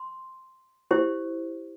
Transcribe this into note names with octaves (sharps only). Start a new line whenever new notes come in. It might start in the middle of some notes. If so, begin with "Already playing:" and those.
Already playing: C6
E4 G4 C5